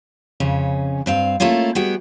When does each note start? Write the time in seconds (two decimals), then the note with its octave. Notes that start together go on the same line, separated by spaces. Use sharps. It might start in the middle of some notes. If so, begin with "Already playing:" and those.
0.40 F2 C#3 C#4
1.06 G2 C4 F5
1.40 A3 A#3 C#4 E4 F4
1.75 G3 B3 F#4 G#4 G5